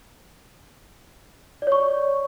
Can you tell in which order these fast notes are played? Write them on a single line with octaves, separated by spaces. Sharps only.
D5 C#5 C#6